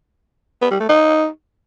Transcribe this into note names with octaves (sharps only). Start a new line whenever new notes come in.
B3
G3
A3
D#4